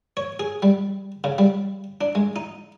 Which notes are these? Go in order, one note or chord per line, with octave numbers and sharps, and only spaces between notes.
C#5
G#4
G3
C#3
G3
D4
G#3
D#4